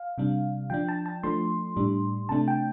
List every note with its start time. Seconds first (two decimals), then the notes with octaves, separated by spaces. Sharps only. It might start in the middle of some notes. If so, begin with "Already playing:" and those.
Already playing: F5
0.18 C3 G3 D4
0.70 F3 D4 G5
0.89 A5
1.06 A5
1.23 F3 A3 D4 C6
1.76 A2 G3 D4
2.29 C3 A3 D4 A5
2.48 G5